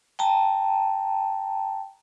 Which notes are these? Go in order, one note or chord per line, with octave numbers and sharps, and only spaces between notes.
G5 A5 A#5